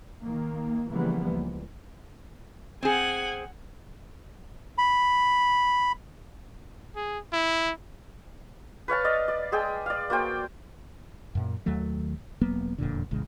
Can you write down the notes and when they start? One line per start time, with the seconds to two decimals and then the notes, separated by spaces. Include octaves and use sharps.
0.24 D#3 A#3
0.92 C#3 E3 F3 G3 A#3 B3
1.30 C#2
2.83 C4 G#4 F#5 G#5
4.78 B5
6.96 G#4
7.33 E4
8.88 B4 C#5 F5 A5
9.04 D5 D#5 F5
9.28 D5
9.52 G#3 G#4 G5 E6
9.86 D5 F5
10.10 A#3 F#4 C5 G5
11.35 F#2 A#2
11.66 D#2 D#3 F#3 A3
12.41 E1 F#3 A#3 B3
12.78 E1 F2 A#2 D3
13.11 D#1 A1 C#3 G#3